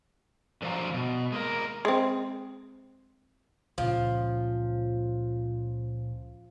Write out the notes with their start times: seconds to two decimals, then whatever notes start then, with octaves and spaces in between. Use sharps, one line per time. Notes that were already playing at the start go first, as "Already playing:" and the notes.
0.62 D3 F3 F#3 F5 A#5
0.94 B2
1.32 G#3 A#3 E4 A#4
1.85 G#3 C4
3.78 C#2 A#2 C#3 F3